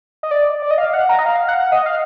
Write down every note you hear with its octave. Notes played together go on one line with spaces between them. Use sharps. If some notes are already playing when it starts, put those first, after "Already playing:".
D#5
D5
D5
D#5
F5
F#5
A#5
D#5
F5
F#5
D#5
F5